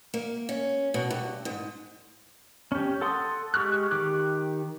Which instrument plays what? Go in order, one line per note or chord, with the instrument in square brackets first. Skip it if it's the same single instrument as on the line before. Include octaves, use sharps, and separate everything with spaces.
[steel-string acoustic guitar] A#3
C#4
B2
G2
G#2
[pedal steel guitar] C#4 G4
A4 F#5 C6 D#6
G#3 G4 C#6 F6 F#6
D#3 G4 D6 F#6